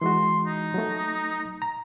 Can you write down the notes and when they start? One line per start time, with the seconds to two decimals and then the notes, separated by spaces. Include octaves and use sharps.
0.01 E3 G#3 F#4 C6
0.45 D#4
0.74 F#3 A3
1.62 A#5